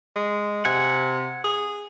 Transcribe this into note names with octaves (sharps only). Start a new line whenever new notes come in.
G#3
C3 F#5 G#5
G#4